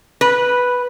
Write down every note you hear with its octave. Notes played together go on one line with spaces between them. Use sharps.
B4